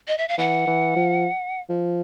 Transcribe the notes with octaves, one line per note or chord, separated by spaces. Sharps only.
D#5
E5
F5
E3 F#5
E3
F3
F3